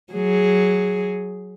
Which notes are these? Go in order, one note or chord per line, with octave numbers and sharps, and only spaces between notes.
F#3 G#4